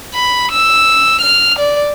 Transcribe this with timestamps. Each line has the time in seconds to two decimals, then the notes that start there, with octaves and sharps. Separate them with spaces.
0.14 B5
0.52 E6
1.21 F6
1.59 D5